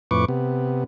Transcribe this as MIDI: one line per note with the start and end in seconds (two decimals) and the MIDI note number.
0.11 0.25 41
0.11 0.25 45
0.11 0.25 71
0.11 0.25 85
0.11 0.25 86
0.28 0.84 48
0.28 0.84 59